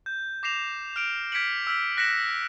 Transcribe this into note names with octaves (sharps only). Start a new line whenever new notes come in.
G6
D6 A#6 C7 E7 F7
F6 D7 F7
F6 G#6 B6 C#7 D7 F#7
E6 F6 B6
F#6 A#6 B6 C#7 E7 F#7